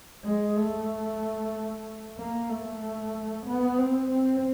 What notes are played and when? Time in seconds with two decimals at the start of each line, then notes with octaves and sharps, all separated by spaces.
0.24 G#3
0.57 A3
2.18 A#3
2.50 A3
3.46 B3
3.79 C4
4.11 C4